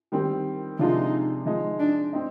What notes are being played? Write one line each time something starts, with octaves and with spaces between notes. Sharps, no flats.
D#3 G3 C4
C3 F3 G#3 D4 D#4 F4
F3 G#3 D#4
D4
C4 D#4